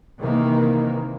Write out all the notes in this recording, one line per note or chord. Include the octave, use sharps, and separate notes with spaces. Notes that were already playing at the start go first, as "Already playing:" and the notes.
C3 D#3 E3 A#3